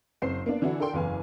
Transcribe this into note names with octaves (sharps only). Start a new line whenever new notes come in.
F#1 C4 C5 C7
A#3 B3 D4
D3 E3 D4 E4 F#4 A4
D4 A4 A#4 G5 C6
F#1 E2 B4 F5 G#5